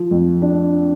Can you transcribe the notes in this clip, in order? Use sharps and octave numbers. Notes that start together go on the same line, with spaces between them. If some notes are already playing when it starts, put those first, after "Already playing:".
Already playing: F3
F2
D4